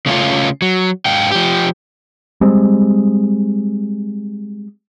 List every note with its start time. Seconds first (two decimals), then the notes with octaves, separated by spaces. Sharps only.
0.06 C#3 A3 C#4 F4
0.62 F#3
1.05 G#2 F5 G5
1.32 F3 G4
2.41 G3 G#3 C4